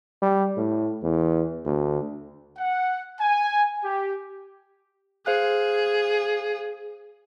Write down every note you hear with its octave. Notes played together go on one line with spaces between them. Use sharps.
G3
A2
E2
D2
F#5
G#5
G4
G#4 C5 F5 F#6